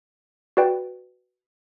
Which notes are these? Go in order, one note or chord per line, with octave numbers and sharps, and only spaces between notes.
F#4 B4 D5 G5